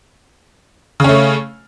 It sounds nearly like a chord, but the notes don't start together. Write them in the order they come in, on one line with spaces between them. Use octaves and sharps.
C#3 C#4 A3